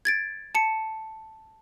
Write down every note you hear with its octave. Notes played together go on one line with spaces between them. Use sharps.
G#6 A6 D7
A5 C#7